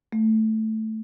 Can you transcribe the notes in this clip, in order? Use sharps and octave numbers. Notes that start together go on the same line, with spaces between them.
A3